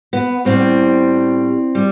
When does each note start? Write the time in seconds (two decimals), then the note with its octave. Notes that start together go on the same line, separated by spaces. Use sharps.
0.13 B3
0.45 A2 G3 C4
1.75 G3